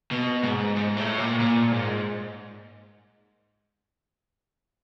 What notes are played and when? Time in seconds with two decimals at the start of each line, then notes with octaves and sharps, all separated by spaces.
0.11 B2
0.43 G#2
0.76 G#2
0.96 A2
1.18 A#2
1.40 A#2
1.72 G#2